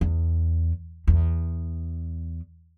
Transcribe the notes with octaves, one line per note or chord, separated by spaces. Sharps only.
E2
E2